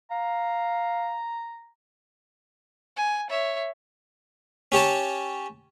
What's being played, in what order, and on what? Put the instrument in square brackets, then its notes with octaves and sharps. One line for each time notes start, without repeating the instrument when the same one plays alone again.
[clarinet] F5 [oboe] A#5
[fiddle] G#5
C#5 E5
[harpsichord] C#4 G4 C#5 A5